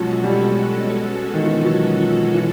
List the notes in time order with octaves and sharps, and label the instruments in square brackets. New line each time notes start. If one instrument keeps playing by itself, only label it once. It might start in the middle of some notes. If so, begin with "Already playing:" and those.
Already playing: [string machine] B2 G#3 C#4 F#4 A4 [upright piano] F3 F#3
[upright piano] G3
D#3
E3
F3
F#3
F3
E3